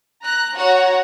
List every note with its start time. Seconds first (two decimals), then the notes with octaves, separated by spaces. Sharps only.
0.22 A#5 F#6
0.55 F#4 C#5 F#5 A#5